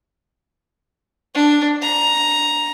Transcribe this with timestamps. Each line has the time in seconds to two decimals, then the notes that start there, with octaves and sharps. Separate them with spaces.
1.34 D4
1.82 A#5